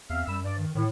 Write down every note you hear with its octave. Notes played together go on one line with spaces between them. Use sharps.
E2 C4 E5 F5
F#2 G3 B5 E6
G2 D5
D#3
A2 D#3